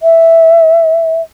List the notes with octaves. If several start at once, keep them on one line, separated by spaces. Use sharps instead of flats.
E5